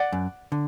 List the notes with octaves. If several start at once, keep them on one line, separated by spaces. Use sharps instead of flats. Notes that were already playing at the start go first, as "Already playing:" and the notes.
Already playing: D5 F#5
F#2
D3